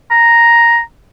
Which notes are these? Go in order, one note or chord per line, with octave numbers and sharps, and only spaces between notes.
A#5